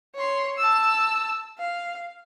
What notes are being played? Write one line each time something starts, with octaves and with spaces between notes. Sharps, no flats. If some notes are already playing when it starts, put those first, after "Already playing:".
C#5 C6
A5 E6
F5